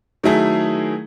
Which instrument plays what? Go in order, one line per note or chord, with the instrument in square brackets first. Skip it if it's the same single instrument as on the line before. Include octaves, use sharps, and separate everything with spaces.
[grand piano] D#3 F#3 A3 E4 G#4